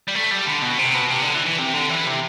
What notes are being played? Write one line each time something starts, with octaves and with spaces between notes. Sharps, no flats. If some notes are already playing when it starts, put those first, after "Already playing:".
G3
A3
G3
D3
B2
C3
B2
C3
D3
E3
E3
C3
D3
E3
C3